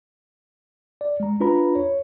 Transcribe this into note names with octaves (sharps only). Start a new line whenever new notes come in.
D5
G#3 A#5
D4 F4 B4 A#5 B5
C#5